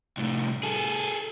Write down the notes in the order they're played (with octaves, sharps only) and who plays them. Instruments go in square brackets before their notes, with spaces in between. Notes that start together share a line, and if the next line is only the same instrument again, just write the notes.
[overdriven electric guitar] C2 A2
G#4 A4